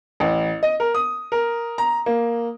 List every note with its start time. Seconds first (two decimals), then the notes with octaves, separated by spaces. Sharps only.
0.20 A1
0.63 D#5
0.80 A#4
0.95 D#6
1.32 A#4
1.78 A#5
2.06 A#3